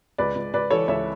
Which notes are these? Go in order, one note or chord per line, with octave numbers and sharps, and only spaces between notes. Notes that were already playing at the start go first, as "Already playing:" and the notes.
C#2 B4 D5
C#2
C#2 B4 D5
E3 A4 C#5
C#2 C#5 E5